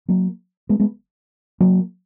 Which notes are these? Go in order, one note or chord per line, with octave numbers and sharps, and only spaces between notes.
F#3 A#3
G#3 B3
G#3 B3
F#3 A#3